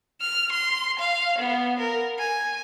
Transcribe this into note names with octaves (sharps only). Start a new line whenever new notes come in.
F6
C6
F5
B3
A#4
G#5